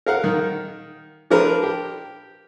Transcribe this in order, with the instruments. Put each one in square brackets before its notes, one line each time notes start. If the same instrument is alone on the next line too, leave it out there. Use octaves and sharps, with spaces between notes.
[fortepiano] A#4 F5 F#5
D#3
F3 D4 A#4 B4
G4